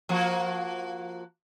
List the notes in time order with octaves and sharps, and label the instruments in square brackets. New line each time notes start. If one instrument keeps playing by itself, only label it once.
[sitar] F3 A#3 F#4